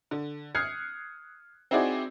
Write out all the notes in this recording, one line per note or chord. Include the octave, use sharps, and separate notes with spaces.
D3
D#6 F6 F#6 G#6 C7 C#7
C4 D#4 E4 F#4 G#4 D5